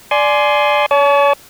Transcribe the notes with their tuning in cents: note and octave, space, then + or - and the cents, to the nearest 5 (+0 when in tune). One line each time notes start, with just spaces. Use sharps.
D5 +0 G#5 +20 C6 +0
C#5 +35 A5 -40